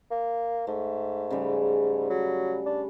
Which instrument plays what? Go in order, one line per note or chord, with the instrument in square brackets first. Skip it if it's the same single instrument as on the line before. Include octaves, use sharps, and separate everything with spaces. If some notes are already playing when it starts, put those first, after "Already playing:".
[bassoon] A#3
[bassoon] G#2 [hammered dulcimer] A3
[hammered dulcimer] C#3 G3
[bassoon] F#3
D4